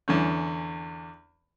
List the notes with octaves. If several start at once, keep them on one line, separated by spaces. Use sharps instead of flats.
E2 D3 C#4